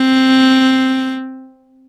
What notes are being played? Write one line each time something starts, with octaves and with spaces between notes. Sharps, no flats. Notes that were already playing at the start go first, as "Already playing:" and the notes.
Already playing: C4